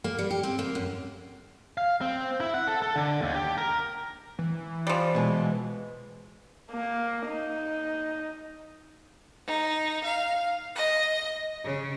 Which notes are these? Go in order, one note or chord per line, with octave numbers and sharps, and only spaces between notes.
A#3
G3
G4
C4
A#3
F#2
F5
C4
E4
F#5
A4
A4
D3
D#2
G4
A#4
E3
F3 G3
B2 G#3
A#3
D#4
D#4
F5
D#5
C#3